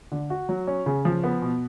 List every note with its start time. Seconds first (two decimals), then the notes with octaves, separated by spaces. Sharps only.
0.12 D3
0.30 F#4
0.49 F#3
0.67 C#4
0.86 C#3
1.05 F3
1.24 B3
1.42 B2